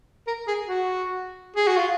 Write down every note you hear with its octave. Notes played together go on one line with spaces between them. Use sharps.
A#4
G#4
F#4
G#4
F#4
F4